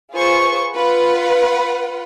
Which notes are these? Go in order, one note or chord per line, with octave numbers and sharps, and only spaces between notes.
F4 G#4 B4 C5 C#6
F4 B4 F#5